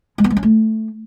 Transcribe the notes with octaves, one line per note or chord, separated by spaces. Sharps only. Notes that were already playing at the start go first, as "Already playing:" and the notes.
G#3
B3
G#3
C#4
A3